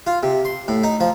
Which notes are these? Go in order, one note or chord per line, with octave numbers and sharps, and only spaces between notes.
F4
C3
C6
A2
D#4
F3